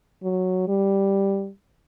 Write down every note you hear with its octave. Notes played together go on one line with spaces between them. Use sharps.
F#3
G3